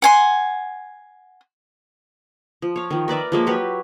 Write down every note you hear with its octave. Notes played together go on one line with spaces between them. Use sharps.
F#5 G#5 C6
F3
C#5 F5
D#3 F3
A#4 B4 D5 E5
F3 G#3 A#3
F#3 G4 B4 C#5